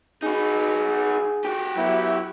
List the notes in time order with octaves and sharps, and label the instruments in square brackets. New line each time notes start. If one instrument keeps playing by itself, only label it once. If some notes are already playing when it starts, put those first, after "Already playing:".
[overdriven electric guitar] D#4 F#4 [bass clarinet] G#4
[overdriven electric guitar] F#4 G4
[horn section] F#3 B3 E4